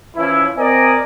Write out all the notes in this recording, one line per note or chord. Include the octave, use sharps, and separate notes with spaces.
E3 F3 C#4 E4
C4 A#4 D5 D#5 G#5